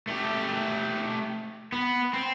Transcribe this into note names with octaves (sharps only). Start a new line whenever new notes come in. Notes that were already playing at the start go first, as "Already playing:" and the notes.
A3 G4
B3
C4